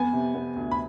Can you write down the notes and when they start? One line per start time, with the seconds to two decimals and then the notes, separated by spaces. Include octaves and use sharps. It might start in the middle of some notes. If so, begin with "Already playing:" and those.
Already playing: F2 B3 G#5
0.13 C3
0.35 B3
0.56 D2
0.71 B5